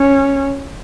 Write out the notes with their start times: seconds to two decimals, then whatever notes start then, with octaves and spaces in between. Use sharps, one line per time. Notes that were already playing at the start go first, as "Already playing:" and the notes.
Already playing: C#4